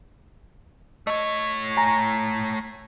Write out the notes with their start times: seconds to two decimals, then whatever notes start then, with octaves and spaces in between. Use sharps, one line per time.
1.07 A3 C#5 D#5
1.77 G#5 A#5 A#6